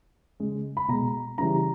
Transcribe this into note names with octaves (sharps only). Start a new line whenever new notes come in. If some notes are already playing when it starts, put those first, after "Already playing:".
C#3 G#3
B5
B2 G#3 A#5
C#3 E3 G3 A#5